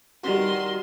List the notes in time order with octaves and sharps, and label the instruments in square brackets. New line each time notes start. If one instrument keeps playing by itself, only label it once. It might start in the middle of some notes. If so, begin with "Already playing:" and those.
[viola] D#3 C6 [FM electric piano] G3 F#4